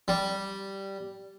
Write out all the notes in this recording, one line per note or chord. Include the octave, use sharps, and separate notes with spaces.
G3